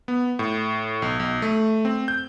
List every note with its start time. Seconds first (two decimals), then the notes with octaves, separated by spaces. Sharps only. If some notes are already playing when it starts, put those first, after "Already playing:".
0.08 B3
0.39 A2
1.02 B1
1.20 B1
1.42 A3
1.85 C4
2.08 G6